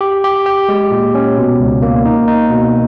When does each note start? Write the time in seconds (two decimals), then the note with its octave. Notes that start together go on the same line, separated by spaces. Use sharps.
0.01 G4
0.24 G4
0.46 G4
0.69 G#3
0.91 A#2
1.15 C#4
1.37 B2
1.60 C#2
1.82 A#3
2.06 D#4
2.28 D#4
2.50 B2